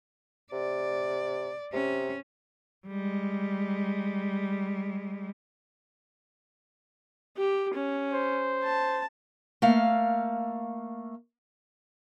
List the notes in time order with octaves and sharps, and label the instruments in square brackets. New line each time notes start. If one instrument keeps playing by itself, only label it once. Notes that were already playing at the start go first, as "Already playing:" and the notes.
[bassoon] C3 [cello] D5
[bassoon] C3 [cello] C#4
[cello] G3 G#3
[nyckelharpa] G4
C#4
[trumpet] C5
[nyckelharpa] A5
[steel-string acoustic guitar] A3 A#3 F5